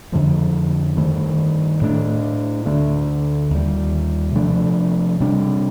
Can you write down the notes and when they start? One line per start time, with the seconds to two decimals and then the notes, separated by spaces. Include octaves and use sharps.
0.12 F2 D3 F3 A3
0.97 G2 D#3 A3
1.81 A2 A3 D4
2.65 D2 D3 A3 D4
3.50 D#2 D#3 G3
4.35 C3 F3 A3 D4
5.20 C3 G3 D4